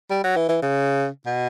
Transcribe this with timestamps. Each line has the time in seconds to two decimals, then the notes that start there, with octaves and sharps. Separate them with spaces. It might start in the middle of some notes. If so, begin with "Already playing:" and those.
0.10 G3
0.24 F#3
0.36 E3
0.49 E3
0.62 C#3
1.26 B2